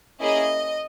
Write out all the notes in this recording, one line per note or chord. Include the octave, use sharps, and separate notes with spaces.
A#3 C#4 E4 G#4 D#5